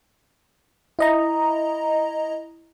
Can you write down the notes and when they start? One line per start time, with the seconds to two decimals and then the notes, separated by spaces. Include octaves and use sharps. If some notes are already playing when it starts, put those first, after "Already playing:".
0.99 E4 D#5 A#5